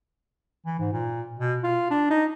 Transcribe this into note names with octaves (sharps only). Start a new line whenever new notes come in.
E3
G#2
A#2
B2
F4
D4
D#4